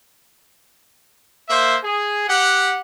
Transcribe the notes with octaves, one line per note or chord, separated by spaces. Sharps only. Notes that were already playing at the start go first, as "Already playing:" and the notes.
A#3 C5 E5
G#4
G4 F#5